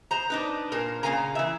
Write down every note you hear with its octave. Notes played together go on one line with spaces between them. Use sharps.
C5 A#5
D4 D#4 B4
A#2 A#4 C5
A#2 C#3 A#3 F5 G#5 A#5
E3 E5